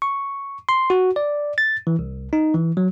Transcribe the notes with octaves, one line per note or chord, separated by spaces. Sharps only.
C#6
C6
F#4
D5
A6
E3
C2
D#4
E3
F#3